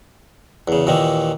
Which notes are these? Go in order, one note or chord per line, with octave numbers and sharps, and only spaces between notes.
E2 C#3
D#2 A#2 D#3 E3